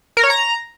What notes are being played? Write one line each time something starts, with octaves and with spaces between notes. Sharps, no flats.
A#4
C#5
A#5